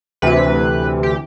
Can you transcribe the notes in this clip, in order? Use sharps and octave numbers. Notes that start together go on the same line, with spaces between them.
D2 C3 E3 B4
G4